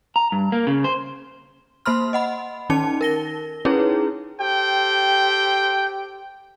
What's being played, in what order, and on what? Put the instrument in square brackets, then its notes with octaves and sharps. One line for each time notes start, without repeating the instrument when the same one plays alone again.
[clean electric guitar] A#5
G2
A#3
C#3
C5
[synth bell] A#3 C5 B5 C6 F6
D#5 F#5 B5
D#3 C#4 D#4 A5 C#7
A#4 A#6 G7
C#4 D#4 E4 G#4 B4 C#5
[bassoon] G4 [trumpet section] A4 C5 G5